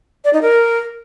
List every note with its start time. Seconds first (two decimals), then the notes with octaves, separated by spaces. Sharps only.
0.24 D5
0.33 D#4
0.42 A#4